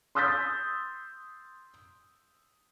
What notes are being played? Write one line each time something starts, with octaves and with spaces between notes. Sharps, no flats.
C6 D#6 E6 G6 A6 B6